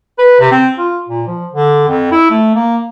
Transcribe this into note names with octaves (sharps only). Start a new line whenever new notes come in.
B4
C3
C4
F4
A#2
F3
D3
F2
E4
A3
A#3